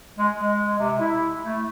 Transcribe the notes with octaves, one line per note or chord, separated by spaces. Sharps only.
G#3
G#3
C3
E4
A3